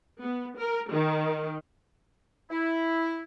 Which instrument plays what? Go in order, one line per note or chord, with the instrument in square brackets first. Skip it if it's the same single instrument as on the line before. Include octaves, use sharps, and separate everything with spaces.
[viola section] B3
A#4
D#3
[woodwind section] E4